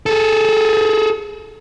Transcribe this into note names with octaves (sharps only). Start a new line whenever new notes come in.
G#4 A4